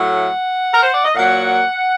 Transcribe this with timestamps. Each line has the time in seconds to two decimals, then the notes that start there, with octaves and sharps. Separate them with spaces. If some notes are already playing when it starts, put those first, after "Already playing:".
Already playing: A2 F#3 A3 F#5
0.72 A#4
0.82 C5
0.93 D5
1.05 D#5
1.14 A#2 F#3 A#3 F#5